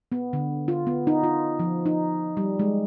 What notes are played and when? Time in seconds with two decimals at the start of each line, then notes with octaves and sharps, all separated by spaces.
0.12 B3
0.33 D3
0.68 F4
0.87 B3
1.07 D#4
1.23 F4
1.59 F3
1.86 D#4
2.37 G3
2.59 G#3